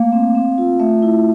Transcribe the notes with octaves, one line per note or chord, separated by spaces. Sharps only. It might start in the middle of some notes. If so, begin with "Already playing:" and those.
Already playing: A3 A#3 F5
C4
C4
F4
A3 E5
E4